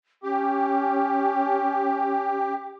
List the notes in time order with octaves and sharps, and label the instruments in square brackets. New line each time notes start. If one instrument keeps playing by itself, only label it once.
[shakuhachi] C#4 [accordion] G4